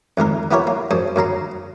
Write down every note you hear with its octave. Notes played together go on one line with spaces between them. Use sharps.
F2 D#3 G#3 A#4
B3 E4 G4 A#4 C#5
A#3
F#2 G#4 C5
F#2 C#3 A#5 C6